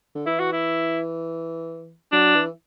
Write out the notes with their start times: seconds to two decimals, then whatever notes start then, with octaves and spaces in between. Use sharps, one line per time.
0.15 D3
0.26 E3 E4
0.39 F#4
0.53 E4
2.12 F#3 D4
2.35 E3